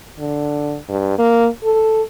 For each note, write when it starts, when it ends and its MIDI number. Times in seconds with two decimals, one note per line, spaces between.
0.19 0.77 50
0.89 1.17 43
1.18 1.47 58
1.64 2.02 69